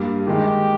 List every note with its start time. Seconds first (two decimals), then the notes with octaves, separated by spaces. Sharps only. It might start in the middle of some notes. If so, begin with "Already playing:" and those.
Already playing: G2 G3 A#3
0.27 D#3 G#3 D#4 G4